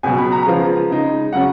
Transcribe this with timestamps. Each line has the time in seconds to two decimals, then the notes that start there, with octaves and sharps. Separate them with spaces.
0.03 C#2 B2 F#3 G#5
0.18 B5
0.32 A#5
0.46 C#3 F3 G#3 B3 F4
0.90 C#3 G#3 D#4
1.32 C#3 F#3 C#4 F#5